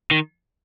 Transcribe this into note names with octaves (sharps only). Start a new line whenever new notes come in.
D#3